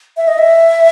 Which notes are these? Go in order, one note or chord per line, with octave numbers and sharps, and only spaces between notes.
E5
D#5
E5